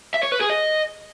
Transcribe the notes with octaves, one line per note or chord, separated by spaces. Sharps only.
E5
C#5
B4
G#4
D#5